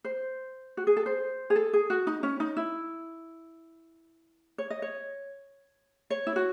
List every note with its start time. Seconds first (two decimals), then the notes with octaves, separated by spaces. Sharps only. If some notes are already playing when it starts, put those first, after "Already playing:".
0.04 C5
0.77 F#4
0.87 G#4
0.97 A4
1.06 C5
1.50 G#4
1.56 A4
1.73 G#4
1.90 F#4
2.07 D#4
2.23 C#4
2.40 D#4
2.57 E4
4.58 C#5
4.70 D#5
4.82 C#5
6.10 C#5
6.27 E4
6.36 F#4